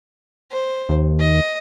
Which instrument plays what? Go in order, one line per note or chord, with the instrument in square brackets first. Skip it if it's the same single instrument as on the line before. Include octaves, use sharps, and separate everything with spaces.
[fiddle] C5
[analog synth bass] D#2
[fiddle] D#5